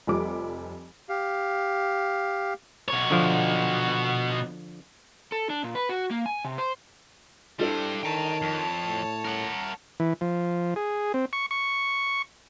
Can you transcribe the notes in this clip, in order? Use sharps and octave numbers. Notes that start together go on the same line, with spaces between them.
F1 F3 G3 D6
G4 F5
B2 C#5
D3 F3
A4
D4
A#2
B4
F#4
A#3
G#5
C3
C5
G2 G3 D4 E4 A4 C5
D#3 C#5 G5 A5 A#5
F2
A2
A#4 F#5
E3
F3
G#4
C4
C#6
C#6